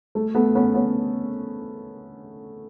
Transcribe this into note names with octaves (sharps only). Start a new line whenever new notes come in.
A3
A3 B3
B3 C#4
B3 C#4